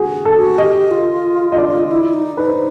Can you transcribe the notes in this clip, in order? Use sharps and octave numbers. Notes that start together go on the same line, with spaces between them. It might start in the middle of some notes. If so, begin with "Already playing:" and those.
Already playing: F#4 G#4
A4
F#4
G4 D#5
F4
D#5
D5
E4
D#4
D#4 B4
C5